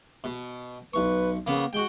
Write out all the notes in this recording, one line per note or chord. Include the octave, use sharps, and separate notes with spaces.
B2
B1 B4 C#6
C#3 A#3 B3
G#3 F#4 G5